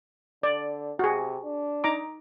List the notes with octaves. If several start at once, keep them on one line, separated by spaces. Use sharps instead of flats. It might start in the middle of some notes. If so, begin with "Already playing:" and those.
D3 D5
C3 F#4 G#4
D4
D#4 A#5 D6